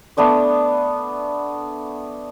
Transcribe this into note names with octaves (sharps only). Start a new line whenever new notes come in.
A3 B3 D4 D6